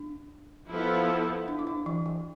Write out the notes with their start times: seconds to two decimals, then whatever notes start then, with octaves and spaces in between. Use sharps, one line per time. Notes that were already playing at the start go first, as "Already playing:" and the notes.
Already playing: D4
0.69 F3 B3 E4 A4
1.48 D4
1.59 E4
1.67 D4
1.86 E3
2.06 E3